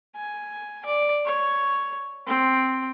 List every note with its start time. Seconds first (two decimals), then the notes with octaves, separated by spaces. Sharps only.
0.16 G#5
0.85 D5
1.26 C#5
2.27 C4